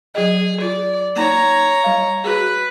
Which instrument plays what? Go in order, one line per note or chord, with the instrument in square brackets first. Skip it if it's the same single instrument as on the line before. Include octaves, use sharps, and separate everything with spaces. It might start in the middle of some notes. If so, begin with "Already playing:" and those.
[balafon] F#3 D#5 [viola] G#4
[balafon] F4 [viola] D5
[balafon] A#3 D#4 [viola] C#5 A#5
[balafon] G3 F5
[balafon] F#4 G#4 [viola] B4